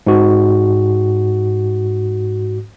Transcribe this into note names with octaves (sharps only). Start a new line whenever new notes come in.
G#2 F#4